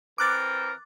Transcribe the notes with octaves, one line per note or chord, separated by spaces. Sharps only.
E3 C4 A#4 D6 F#6 A6